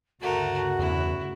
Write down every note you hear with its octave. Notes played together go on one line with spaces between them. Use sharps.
D2 G2 C#3 A3 F#4 A#4
E2 E4